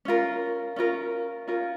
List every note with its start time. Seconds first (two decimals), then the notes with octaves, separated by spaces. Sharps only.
0.05 C#4 F4 A#4
0.76 C#4 F4 A#4
1.47 C#4 F4 A#4